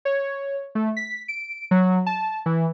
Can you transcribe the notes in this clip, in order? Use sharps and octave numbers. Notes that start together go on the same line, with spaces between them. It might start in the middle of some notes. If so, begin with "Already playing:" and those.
C#5
A3
B6
D7
F#3
A5
E3